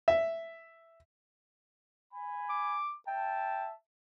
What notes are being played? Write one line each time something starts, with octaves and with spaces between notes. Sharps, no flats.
E5
G#5 B5
D6
E5 G5 A5